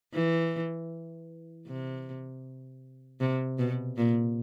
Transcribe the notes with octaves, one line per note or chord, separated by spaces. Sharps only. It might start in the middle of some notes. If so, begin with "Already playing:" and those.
E3
C3
C3
B2
A#2